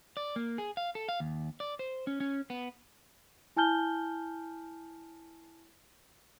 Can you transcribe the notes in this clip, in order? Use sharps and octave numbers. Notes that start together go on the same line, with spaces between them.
D5
A#3
G#4
F5
A4
F5
D#2
D5
C5
C#4
C#4
B3
E4 G#5 A5 F6 G6 G7